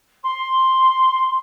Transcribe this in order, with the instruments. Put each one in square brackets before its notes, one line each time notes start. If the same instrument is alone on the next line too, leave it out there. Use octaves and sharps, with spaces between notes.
[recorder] C6